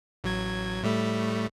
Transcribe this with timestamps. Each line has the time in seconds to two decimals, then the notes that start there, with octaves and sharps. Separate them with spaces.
0.24 A1 F#3 G#6
0.83 A2 G3 A3